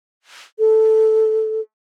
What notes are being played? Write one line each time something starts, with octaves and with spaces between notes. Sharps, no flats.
A4